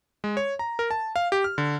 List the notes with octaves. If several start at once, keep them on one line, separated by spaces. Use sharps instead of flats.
G#3
C#5
A#5
A#4
A5
F5
G4
F6
D3